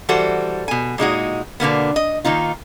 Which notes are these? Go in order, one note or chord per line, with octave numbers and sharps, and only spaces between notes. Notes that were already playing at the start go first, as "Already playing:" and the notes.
E3 G3 F#4 A4 C5
B2 G#5
A#2 G#3 D#4 F#4
B2 D3 A#3 B3
D#5
D#3 A#3 D#4 F4